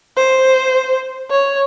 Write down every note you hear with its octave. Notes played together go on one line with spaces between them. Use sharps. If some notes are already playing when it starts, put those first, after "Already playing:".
C5
C#5